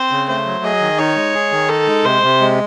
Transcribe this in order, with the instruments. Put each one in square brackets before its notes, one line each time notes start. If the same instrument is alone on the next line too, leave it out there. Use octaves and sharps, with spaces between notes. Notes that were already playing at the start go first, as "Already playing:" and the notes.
Already playing: [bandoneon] C4 [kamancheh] C5
[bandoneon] C#3
[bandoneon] A3 [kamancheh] C5
[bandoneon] F#3
[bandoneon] G#4 [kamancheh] D#5
[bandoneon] D#3
[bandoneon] D#4 [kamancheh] C#5
[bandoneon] G#3
G#4
D#3
[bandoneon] D#4 [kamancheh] A4
[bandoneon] G#3
[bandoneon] C3 [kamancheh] C5
[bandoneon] C3
G#3